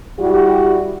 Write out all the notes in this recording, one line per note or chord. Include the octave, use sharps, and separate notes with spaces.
G3 E4 F#4 G4